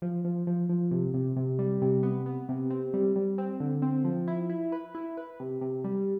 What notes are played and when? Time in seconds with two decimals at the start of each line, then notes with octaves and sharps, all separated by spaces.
0.02 F3
0.25 F3
0.47 F3
0.69 F3
0.91 C3
1.14 C3
1.36 C3
1.59 G3
1.82 C3
2.03 B3
2.26 B3
2.49 C3
2.70 C4
2.94 G3
3.16 G3
3.38 C4
3.60 D3
3.82 C4
4.04 F3
4.28 E4
4.50 E4
4.72 B4
4.95 E4
5.17 B4
5.40 C3
5.61 C3
5.84 G3